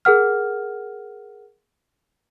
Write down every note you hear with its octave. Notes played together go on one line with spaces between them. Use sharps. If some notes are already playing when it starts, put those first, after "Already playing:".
G#4 A#4 F#5 F6